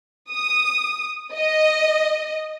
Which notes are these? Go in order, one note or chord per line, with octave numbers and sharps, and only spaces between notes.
D#6
D#5